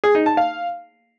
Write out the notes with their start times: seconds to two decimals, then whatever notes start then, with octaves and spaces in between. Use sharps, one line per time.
0.04 G#4
0.15 D#4
0.26 A5
0.37 F5